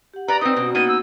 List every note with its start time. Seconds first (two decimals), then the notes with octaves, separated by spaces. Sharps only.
0.14 G4 F#5
0.28 B4 D5 A#5
0.41 C4 D#4 B4 C5 D5 D#6
0.56 B2 C#4 F#4
0.75 A#3 B3 D#4 D#7
0.88 E6